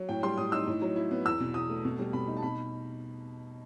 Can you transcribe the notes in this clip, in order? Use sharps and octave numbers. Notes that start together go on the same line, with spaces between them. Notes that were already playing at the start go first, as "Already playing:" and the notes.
Already playing: F#3
A2 G5
G3 C6
A2 D#6
D#4 E6
A2
F#3
E4
B3
E2 E6
B2
E2 D#6
A3
B2
G3
B2 B5
D#4
A5
B2 B5